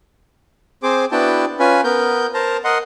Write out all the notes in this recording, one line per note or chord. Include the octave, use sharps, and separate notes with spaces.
C4 G#4 C5 D6
B3 D4 E4 F#4 G5 A5
C#4 F4 B4 G#5
B3 A#4 G6
A#4 C5 A5 A#5
A#4 D#5 F#5 C6